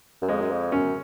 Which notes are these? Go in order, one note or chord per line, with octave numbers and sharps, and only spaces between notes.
F#2
F2 G#3
F#2
F2
F#2 C#4